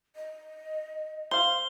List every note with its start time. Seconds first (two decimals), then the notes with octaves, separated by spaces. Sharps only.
0.16 D#5
1.31 C5 F5 G7